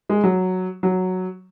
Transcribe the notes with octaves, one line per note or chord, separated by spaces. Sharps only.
G#3
F#3
F#3